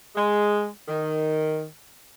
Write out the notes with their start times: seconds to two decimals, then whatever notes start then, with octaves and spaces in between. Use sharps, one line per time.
0.16 G#3
0.88 D#3